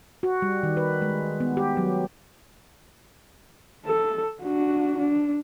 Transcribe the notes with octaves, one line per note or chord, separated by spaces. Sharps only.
F#4
G3
D#3
B4
G#3
B3
G4
F#3
A4
D4 F#4
D4